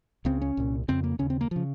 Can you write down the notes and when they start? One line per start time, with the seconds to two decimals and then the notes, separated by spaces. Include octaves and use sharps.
0.25 C#2 C#3 C4
0.42 C#4
0.57 C2 A#2
0.88 F2 C#3 C4
1.04 A#3
1.19 D#2 C#3 C#4
1.30 C4
1.41 A#3
1.51 C#3 F3